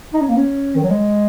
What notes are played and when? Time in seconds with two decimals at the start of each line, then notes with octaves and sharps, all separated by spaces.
0.14 D#4
0.22 C#4
0.29 A#3
0.37 C#4
0.76 D#3
0.83 F#3
0.90 G#3